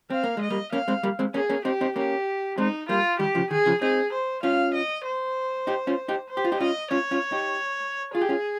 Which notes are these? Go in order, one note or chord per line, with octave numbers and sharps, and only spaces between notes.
C4 F5
A#3
G#3 D#5
G3 A#3
A#3 C#4 F5
G#3 C4
G3 A#3
G#3 C4
A#3 C#4 G#4
A#3 C#4
C4 D#4 G4
C4 D#4
A#3 C#4 G4
G#3 C4 D#4
G3 A#3 F4
D#3 G3 G4
C#3 F3
D#3 G#4
C#3 F3
C4 D#4 G#4
C5
C#4 F4 F5
D#5
C5
D#4 G4
C#4 F4
D#4 G4
C5
G4
F4
D#4 G4
C#4 F4 D#5
C#4 F4 C#5
C#4 F4
D#4 G4
F4 G#4
G4
C#4 F4